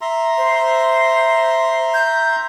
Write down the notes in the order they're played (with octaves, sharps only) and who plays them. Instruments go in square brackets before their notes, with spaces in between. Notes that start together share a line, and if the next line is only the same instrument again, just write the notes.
[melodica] E5 A#5 C6
[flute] C5
G6